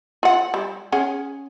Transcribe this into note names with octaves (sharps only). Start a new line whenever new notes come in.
F4 F#5
G3
C#4 G#4 F#5